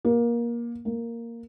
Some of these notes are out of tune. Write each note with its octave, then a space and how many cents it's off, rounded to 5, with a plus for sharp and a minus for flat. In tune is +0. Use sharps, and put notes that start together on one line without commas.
A#3 +20
A#3 -5